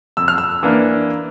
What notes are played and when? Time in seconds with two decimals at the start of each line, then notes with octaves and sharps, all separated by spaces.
0.17 F2 E6
0.28 F6
0.38 E6
0.63 E3 A#3 D4